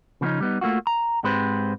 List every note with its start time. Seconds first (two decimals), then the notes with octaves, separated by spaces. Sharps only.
0.21 C#3 F3 A3 B3 C#4 D#4
0.41 G3 B3 D#4
0.61 A3 A#3 F4 F#4
0.87 A#5
1.24 G#2 G#3 C4 G4 B4 C5